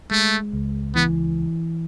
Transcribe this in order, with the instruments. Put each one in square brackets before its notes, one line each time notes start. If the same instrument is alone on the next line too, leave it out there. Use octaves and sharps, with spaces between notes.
[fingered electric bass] G#3 [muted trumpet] A3
[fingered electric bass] C#2
[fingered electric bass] E3 [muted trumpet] B3